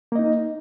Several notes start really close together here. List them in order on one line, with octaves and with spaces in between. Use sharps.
A#3 D#5 D#4